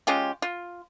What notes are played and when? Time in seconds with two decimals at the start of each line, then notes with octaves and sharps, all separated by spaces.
0.07 G#3 C#4 F4 G4
0.42 F4